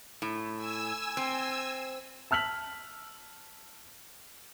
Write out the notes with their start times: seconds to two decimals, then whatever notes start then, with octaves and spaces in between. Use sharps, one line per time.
0.22 A2
0.56 G#5 E6
1.17 C4
2.31 A5 E6 F6 B6 F#7